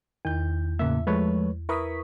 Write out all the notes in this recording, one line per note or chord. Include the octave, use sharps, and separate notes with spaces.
E2 D#3 G6
A2 C#3 A#3 E5
F3 G#3 A3 B4 C#5
E4 A#4 B4 C#6 D#6 B6